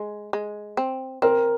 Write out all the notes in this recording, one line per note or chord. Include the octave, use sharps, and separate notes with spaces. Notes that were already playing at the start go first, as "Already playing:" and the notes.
Already playing: G#3
G#3
C4
C4 A#4